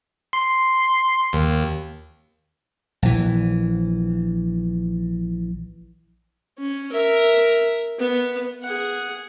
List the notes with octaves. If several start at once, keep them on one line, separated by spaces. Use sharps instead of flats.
C6
D#2
A#1 E3
C#4
A#4 E5
B3
G#4 F#5